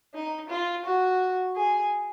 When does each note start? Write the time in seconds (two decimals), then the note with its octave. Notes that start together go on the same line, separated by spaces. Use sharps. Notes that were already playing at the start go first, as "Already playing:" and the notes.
0.14 D#4
0.50 F4
0.85 F#4
1.56 G#4